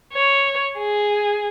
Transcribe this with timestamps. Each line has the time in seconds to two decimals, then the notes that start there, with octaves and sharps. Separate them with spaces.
0.13 C#5
0.77 G#4